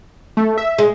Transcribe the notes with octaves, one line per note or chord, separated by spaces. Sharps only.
A3
E5
G#3